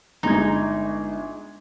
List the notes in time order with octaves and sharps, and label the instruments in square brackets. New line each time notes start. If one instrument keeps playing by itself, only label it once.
[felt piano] G1 G#3 G#6 [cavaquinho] D#4